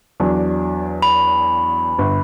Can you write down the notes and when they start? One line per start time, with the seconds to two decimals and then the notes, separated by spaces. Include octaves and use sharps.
0.20 E2 F#3 D4
1.02 B5
1.98 G1